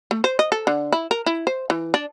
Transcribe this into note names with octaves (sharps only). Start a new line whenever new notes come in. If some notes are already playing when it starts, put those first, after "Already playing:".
A3
C5
D#5
A4
D3
E4
A#4
E4
C5
E3
D4